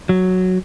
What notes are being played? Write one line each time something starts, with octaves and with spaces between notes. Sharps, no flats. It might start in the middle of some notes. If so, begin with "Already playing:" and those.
F#3